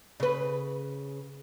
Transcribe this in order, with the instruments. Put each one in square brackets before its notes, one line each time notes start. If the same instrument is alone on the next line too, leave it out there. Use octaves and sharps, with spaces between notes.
[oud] C#3 B4